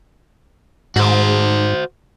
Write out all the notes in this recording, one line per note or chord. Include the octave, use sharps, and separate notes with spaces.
G#2 F#4 C5